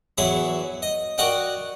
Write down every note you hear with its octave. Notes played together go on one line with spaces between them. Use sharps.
E2 F#3 E4 G#4 B5
D#5
F#4 A#4 D5 D#5 F#5 G5